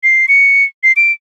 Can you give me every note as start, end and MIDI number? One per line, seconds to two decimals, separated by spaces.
0.03 0.26 96
0.28 0.64 97
0.83 0.92 96
0.96 1.12 98